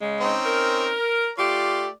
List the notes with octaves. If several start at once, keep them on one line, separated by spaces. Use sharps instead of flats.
C#3 G#3
C4 C#4 D#4
A#4
A3 F4 G4 D5